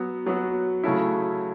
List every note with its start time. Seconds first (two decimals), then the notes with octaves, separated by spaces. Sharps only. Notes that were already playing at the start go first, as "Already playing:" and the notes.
Already playing: F#3 B3 F#4
0.26 F#3 B3 F#4
0.84 C#3 F#3 A3 C#4 E4